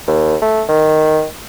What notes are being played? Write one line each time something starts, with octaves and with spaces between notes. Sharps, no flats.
D#2
A3
D#3